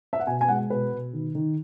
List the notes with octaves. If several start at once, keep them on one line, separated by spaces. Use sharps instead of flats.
E5
F#5
B2 G#5
G#5
G#3 F#5
B2 B4
B2
D#3
D#3